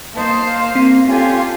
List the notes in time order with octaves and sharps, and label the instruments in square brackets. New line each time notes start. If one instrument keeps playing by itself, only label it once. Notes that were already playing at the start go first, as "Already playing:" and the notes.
[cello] A#3 C5 [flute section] D#4 A5
[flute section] F5
[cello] A#3 [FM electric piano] C4
[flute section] C#4 G4 G#5 [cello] F4 A4